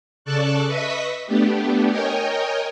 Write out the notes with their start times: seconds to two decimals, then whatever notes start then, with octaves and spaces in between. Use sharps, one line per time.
0.25 C#3 A4 D5 A5 C#6 F#6
0.67 B4 D#5 E5 C#6 D#6 B6
1.27 A3 B3 D4 G4
1.91 A#4 C#5 D#5 G5 G#5